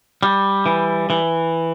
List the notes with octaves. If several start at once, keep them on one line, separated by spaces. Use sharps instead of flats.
G3
E3
E3